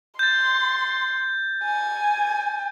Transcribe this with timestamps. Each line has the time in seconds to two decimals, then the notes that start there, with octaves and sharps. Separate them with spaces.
0.19 C6 G6 A6
1.64 G#5